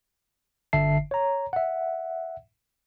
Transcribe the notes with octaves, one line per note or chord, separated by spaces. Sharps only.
G1 D3 E5 A5 C7
C#5 A#5
E5 F#5